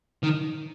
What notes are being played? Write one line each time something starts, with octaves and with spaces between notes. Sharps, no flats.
D#3